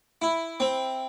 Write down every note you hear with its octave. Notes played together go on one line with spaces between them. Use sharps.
E4
C4